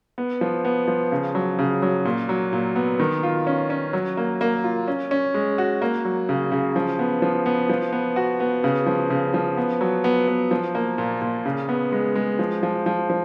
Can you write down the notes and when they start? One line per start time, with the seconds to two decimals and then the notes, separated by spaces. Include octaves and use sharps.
0.18 B3
0.41 F3
0.65 B3
0.88 F3
1.12 C#3
1.35 F#3
1.59 C#3
1.82 F#3
2.05 A#2
2.29 F#3
2.53 A#2
2.76 B3
2.99 D#3
3.23 F4
3.47 C#4
3.70 C#4
3.93 F#3
4.17 A#3
4.41 A#3
4.64 F4
4.88 C#4
5.11 C#4
5.34 G#3
5.58 F#4
5.82 A#3
6.05 F#3
6.29 C#3
6.52 C#3
6.76 F3
6.99 B3
7.22 F3
7.46 B3
7.69 F3
7.92 B3
8.16 F#4
8.40 B3
8.64 C#3
8.86 F3
9.10 C#3
9.34 F3
9.57 B3
9.81 F#3
10.04 B3
10.28 B3
10.51 F3
10.75 A#3
10.98 A#2
11.22 A#2
11.46 C#3
11.69 B3
11.92 G#3
12.15 G#3
12.39 F3
12.63 F3
12.86 F3
13.10 F3